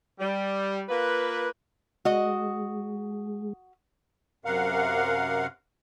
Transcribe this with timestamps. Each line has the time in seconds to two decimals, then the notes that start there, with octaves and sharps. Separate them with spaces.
0.19 G3
0.89 A#3 F4 B4
2.05 G#3 F#4 D#5
4.45 F#2 C3 A#4 F5 F#5